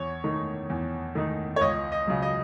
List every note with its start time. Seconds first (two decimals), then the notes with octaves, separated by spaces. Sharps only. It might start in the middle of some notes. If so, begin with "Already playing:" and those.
Already playing: E2 C#5
0.24 D#3 A3 D#4
0.70 E2
1.15 D#3 A3 D#4
1.56 C#5
1.61 C#2 D#5
1.92 D#5
2.07 C#3 F#3
2.22 D#5